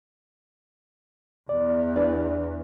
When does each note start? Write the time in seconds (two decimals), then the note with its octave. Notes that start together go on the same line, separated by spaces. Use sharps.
1.49 E2 D5
1.96 D4 E4 B4 D5